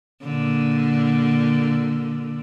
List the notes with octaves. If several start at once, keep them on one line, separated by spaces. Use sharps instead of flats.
A#2 D3